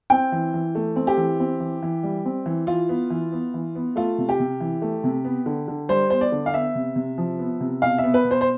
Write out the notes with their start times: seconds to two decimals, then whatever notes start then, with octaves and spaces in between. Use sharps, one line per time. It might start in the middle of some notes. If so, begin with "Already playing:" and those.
0.10 C4 G5
0.32 E3
0.54 E3
0.75 A3
0.96 C4
1.07 G4
1.17 E3
1.40 C4
1.60 E3
1.83 E3
2.03 G3
2.25 C4
2.46 E3
2.67 E3 F4
2.89 B3
3.10 E3
3.32 B3
3.54 E3
3.75 B3
3.96 A3 F4
4.18 C3
4.29 G4
4.40 C3
4.60 E3
4.82 A3
5.04 C3
5.25 B3
5.46 D3
5.68 D3
5.89 G3 C5
6.10 B3 C5
6.21 D5
6.32 D3
6.46 F5
6.53 B3 E5
6.75 C3
6.96 C3
7.18 F3
7.39 B3
7.60 C3
7.82 B2 F5
7.98 E5
8.04 B3
8.14 B4
8.25 B2
8.31 C5
8.41 C5